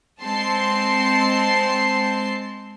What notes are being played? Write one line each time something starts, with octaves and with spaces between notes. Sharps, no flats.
G#3 C4 A5 C6 C7